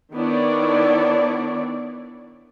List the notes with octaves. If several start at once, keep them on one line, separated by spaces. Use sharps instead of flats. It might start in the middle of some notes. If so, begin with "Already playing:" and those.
D#3 B3 D4 E4 C#5 D5